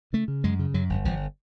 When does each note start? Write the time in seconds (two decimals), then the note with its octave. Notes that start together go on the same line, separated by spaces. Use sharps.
0.13 C#3 A3
0.28 C#3
0.44 F#2 G#3
0.59 C#3
0.74 F#2 F#3
0.90 G1
1.05 G1 F3